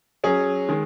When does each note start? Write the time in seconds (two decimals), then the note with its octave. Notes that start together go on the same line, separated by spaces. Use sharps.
0.24 F#3 C#4 G#4
0.69 D#3 G#3